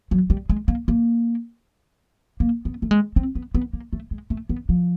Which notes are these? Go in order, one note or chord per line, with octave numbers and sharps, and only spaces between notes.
F#3
G3
G#3
A#3
A#3
A#3
B3
A3
G#3
C4
B3
B3
A#3
A3
G#3
A3
B3
F3